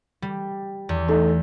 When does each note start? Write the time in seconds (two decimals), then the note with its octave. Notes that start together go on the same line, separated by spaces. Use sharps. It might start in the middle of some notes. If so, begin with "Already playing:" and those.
0.22 G3
0.89 E2
1.08 A3 D#4 A4